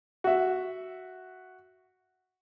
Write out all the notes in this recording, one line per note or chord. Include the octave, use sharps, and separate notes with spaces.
F#4 E5